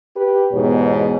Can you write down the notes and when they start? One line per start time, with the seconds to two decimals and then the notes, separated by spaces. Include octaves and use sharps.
0.16 G4 B4
0.52 E2 G#2 B2 C#5